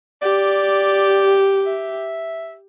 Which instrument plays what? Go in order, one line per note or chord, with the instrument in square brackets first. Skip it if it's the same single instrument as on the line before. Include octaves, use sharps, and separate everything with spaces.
[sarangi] G4 [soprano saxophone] D5
[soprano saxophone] E5